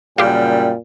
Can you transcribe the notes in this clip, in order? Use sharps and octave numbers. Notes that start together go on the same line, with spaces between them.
F#2 A#2 C#3 G3 F4 G4 G5